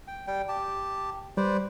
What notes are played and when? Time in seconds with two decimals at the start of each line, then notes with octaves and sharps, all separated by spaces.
0.07 G5
0.27 G3 G5
0.49 G4 A5
1.37 G3 B4 C5 D5